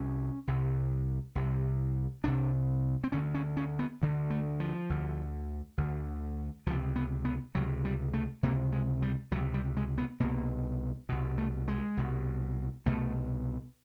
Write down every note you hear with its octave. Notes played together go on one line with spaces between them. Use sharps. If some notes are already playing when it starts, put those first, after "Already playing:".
Already playing: C2 C3 C#4
C2 C3
C2 C3
C2 C3 D4
C4
D2 D3 C#4
C#4
C#4
B3
D2 D3
A3
F3
D2 D3
D2 D3
C#2 C3 F3
B3
B3
C#2 C3 F#3
G3
A3
C#2 C3 A#3
G#3
G3
C#2 C3 F#3
G3
G#3
B3
C2 B2 A#3
C2 B2
A3
G#3
C2 B2
C2 B2 A3